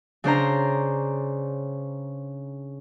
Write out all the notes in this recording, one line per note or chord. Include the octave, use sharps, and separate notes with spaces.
C#3 D4 C5 A#5